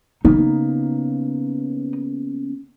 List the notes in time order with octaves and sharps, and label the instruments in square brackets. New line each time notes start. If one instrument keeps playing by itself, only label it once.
[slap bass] C#3 A#3 B3 [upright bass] D#4